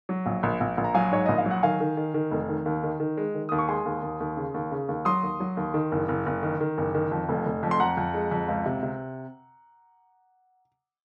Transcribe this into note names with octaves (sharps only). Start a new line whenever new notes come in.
F#3
A#1
A#1
A#1
A#1
A#5
F#3 F5 G#5
G#2 C#5
A#1 D#5
F5
F#3
F#5
D#3 F5 G#5
D#3
D#3
D#3
F1
D#3
D#2
D#3
D#3
G#3
D#3
D#2 D#6
C#6
G#3 G#5 C6
D#2
D#2
D#2
C#3
D#2
C#3
D#2
F#3 C6 D#6
D#2
F#3
D#2
D#3
F#1
F#1
F#1
D#3
D#3
F#1
D#3
F2
F1
F1
F2
C6
F2 F#5 A#5
F2
G#3
F2
C#2
C3
C3